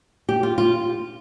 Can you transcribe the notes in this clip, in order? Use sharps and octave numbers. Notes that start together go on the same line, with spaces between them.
G4
F4
F4